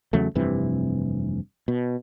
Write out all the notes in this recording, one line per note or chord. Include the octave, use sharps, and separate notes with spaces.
E2 C#3 F#3 A3
F1 G2 C3 E3
B2